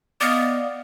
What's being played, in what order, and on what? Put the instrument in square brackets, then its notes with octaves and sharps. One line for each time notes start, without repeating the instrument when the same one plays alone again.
[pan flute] B3 [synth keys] D5 D#5 F5